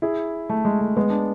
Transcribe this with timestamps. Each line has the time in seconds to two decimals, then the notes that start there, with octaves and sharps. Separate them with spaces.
0.02 E4 G#4
0.49 A3
0.65 G#3
0.81 A3
0.97 G#3 B3
1.10 D4